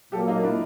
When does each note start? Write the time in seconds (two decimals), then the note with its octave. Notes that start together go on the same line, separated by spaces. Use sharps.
0.12 A#2 F#3 A#3 G4 A4
0.28 D#4 F4
0.43 D4 E4